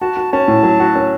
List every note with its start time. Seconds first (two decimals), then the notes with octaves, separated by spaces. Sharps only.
0.01 F#4 A5
0.17 F#4
0.32 C#4 A5
0.48 A2
0.63 F#3
0.80 F#4
0.96 C#4